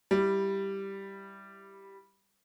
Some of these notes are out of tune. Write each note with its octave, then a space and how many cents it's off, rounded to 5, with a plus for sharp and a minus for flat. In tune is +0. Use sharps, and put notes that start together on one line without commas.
G3 +0 E4 +0